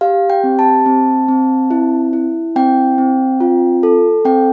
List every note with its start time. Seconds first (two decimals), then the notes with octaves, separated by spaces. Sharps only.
0.01 G4 F5
0.30 G5
0.44 C4
0.59 A5
0.86 C4
1.28 C4
1.71 E4
2.13 E4
2.56 C4 G5
2.98 C4
3.40 F4
3.83 A4
4.25 C4 G5